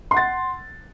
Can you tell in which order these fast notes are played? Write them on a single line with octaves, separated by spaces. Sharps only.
C6 F#5 A6